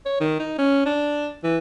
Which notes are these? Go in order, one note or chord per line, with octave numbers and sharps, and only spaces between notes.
C#5
D#3
D#4
C#4
D4
E3